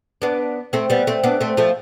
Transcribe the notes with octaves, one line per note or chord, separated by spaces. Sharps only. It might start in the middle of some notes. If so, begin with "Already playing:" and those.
B3 D4
A3 C4
G3 B3
A3 C4
B3 D4
A3 C4
F3 A3